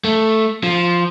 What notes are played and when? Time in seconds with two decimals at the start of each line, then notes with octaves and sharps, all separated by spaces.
0.04 A3
0.63 F3